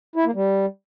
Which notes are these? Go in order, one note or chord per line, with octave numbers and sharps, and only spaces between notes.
E4
A#3
G3